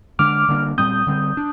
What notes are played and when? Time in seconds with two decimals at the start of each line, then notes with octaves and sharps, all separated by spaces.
0.19 D3 G#3 D4 D6 F6
0.49 D3 G3 A#3 D4
0.78 A#2 G3 C4 D#6 G6
1.07 D3 G3 C4
1.37 D4